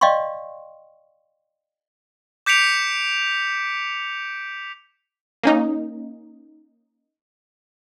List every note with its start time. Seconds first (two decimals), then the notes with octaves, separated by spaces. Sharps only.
0.01 D5 D#5 F5 G5 C6 C#6
2.46 D6 G6 B6 C#7 D7 F7
5.43 A#3 C#4 D#4